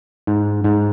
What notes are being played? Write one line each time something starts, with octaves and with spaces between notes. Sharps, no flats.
G#2
G#2